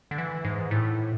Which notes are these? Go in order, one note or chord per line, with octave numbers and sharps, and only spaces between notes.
D3
E3
G#2
A2